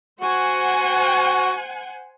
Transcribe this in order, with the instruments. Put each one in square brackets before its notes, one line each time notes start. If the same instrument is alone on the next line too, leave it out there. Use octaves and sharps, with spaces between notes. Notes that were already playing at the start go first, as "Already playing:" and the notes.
[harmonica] F#4 [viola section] C5 F#5 G#5